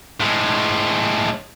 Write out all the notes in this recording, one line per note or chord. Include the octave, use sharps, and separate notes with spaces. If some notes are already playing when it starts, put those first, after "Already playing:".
A2 G#3